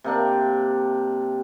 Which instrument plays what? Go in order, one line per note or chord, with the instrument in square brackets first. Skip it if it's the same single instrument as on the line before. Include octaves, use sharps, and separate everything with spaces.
[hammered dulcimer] C3 A#3 D4